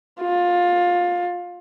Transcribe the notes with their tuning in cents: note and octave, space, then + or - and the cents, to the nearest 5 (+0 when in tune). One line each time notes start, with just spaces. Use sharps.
F4 +20